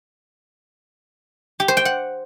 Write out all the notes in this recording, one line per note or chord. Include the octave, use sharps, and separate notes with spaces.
G4
C5
G5
F#5